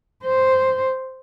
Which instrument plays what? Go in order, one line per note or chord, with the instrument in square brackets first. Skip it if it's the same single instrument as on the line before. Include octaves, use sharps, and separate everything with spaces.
[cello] C5